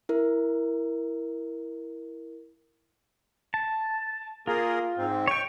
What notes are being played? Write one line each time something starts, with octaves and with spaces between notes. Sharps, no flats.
E4 A#4
A5
A#3 F4 G#4 A#4
G#2 C4
C#5 G5 C#6